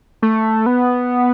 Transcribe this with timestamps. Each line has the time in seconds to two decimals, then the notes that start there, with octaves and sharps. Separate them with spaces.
0.23 A3
0.66 B3